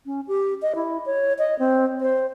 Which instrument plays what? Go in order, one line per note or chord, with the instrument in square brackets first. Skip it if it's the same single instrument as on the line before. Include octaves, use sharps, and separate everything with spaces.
[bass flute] C#4
G4
D#5
E4
C#5
D#5
C4
C5